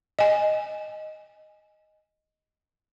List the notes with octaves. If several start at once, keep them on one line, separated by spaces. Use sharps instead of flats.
D#5 G#5